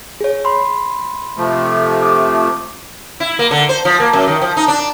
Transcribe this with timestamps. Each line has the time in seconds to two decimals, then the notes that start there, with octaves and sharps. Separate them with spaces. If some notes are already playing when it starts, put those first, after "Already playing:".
0.21 G#4 C#5
0.45 B5 C6
1.37 C3 F3 A3
2.02 D6 D#6
3.20 E4
3.39 A#3
3.51 D3
3.69 C5
3.85 F3
4.00 A#3
4.13 F#2
4.27 D#3
4.41 F3
4.57 D#4
4.68 D4